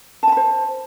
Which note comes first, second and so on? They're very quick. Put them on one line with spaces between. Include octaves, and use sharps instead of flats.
A5 G#5 B5 C5